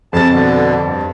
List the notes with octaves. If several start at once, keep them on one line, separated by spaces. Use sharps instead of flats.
F2 A5 A6
B2 D3
G2